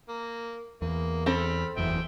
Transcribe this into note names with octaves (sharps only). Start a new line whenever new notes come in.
A#3
E2 A#3
C4 A4 B5 F6
F#1 E2 E5 G5